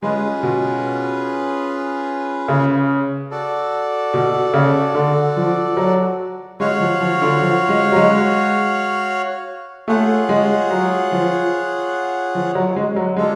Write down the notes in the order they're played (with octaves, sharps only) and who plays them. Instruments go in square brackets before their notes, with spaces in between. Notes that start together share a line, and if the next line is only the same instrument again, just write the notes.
[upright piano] G#3 [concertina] C#4 F4 G#4 B4
[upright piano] B2
C#3
[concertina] F#4 A4 D5
[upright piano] B2
C#3
D3
F3
F#3
[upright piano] G#3 [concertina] F#4 C#5 F5
[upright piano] F3
F3
D3
F3
G#3
F#3
G#3
[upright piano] A3 [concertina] F4 G#4 C#5 F#5
[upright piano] G#3
F#3
F3
F3
F#3
G#3
F#3
[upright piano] G#3 [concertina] D4 F4 A4